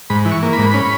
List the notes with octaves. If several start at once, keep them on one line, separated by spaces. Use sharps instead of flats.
G#2 B5
E3
C#6
A#3
B5
G#2
C#4